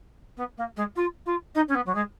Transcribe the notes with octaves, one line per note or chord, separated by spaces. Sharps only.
B3
A#3
G#3
F4
F4
D#4
C#4
B3
F#3
G#3